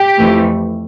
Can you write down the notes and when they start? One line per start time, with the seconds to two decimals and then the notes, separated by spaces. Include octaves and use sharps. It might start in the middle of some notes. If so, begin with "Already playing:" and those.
Already playing: G4
0.17 F2 E3 A3